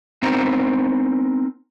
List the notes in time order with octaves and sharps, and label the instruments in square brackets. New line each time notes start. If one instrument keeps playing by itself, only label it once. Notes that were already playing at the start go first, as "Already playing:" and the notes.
[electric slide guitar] B3 C4 D#4 A#4 C5 A#5